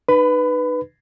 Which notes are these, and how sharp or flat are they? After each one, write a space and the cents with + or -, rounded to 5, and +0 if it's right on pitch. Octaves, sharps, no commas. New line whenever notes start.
D#4 -35 B4 +0 B5 +25